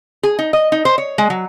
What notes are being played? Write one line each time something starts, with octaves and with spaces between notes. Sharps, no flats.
G#4
D#4
D#5
D#4
C5
C#5
G#3
F#3